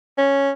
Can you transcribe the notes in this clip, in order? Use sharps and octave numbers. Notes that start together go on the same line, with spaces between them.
C#4